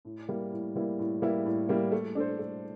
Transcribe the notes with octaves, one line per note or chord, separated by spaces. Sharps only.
A2
G3 A#3 E4
A2
G3 A#3 E4
A2
G3 A#3 E4
A2
G3 A#3 E4
A3
D4 A4 C5
A3